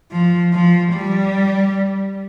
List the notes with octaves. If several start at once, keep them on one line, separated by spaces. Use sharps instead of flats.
F3
F3
G3